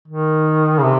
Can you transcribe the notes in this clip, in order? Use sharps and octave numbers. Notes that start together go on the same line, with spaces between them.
D#3
C#3
C3